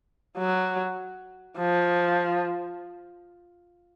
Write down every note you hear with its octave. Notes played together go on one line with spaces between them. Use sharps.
F#3
F3